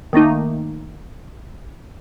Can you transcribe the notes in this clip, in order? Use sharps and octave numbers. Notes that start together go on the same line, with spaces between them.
D#3 A3 A#3 D#4